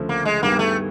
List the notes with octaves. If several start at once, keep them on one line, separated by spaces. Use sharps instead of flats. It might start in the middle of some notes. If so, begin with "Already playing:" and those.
Already playing: D2 C#3 F3 A3
A#3
G#3
G2 D#3 G3 A#3 B3
A3